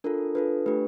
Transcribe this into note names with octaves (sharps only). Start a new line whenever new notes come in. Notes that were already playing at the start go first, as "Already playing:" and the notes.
D4 F4 A4 A#4
D4 F4 A4 B4
A3 D4 G4 B4